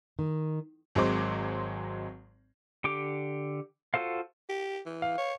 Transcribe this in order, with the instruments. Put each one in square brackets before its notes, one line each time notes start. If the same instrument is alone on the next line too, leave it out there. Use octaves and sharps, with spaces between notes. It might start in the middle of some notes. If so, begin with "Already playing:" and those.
[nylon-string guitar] D#3
[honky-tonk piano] G#1 F#3 G#3 C4 C5 D6
[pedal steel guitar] D3 G4 D6
F4 F#4 A4 C5 F5
[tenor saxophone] G4
E3
[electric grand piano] F5
[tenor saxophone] C#5